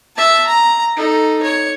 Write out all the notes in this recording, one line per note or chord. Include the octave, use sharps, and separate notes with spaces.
E5 A5
A#5
D#4 A4
C#5